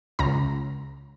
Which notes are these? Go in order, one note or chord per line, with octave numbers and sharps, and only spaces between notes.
C#2 A#5